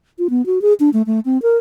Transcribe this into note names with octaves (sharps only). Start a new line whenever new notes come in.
F4
B3
F#4
G#4
D4
A3
A3
C4
A#4